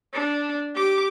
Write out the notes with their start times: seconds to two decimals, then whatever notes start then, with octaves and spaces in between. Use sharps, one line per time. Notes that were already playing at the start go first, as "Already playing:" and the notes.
0.13 D4
0.75 G4 D6